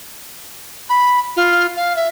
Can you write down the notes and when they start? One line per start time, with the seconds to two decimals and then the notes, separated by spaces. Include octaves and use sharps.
0.89 B5
1.36 F4
1.76 F5
1.96 E5